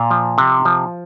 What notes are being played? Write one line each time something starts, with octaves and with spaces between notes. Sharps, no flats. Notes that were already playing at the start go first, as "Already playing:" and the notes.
Already playing: A#2 F5
F3
C3
F3